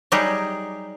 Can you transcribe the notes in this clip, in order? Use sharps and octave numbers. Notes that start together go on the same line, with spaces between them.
F#3 G3 D#4 G4 G#4